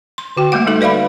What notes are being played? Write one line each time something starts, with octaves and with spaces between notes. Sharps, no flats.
C6
D3 F#4 G5
G3 A3 A#3 F#4 F#5
G3 D#4 A4 E5
B4 D5 E5 F5 B5